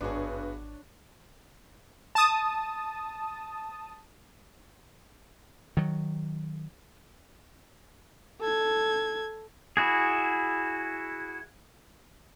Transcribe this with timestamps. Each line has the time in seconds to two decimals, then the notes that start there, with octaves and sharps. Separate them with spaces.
0.01 G#1 G2 B3 D4 F#4 G#4 C#5
2.15 A5 D#6
5.77 D#3 F#3
8.41 A4 G#6
9.77 E4 F#4 G#4